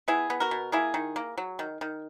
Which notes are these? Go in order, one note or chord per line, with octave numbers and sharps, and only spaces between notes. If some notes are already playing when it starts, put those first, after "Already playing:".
B3 E4 G#4
B3
F#4 A#4
B2
A#3 E4 G#4
D#3
A#3
F#3
D#3
D#3